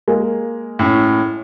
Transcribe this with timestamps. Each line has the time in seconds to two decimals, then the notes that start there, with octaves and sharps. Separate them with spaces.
0.08 G#3 A#3
0.79 A2 C#4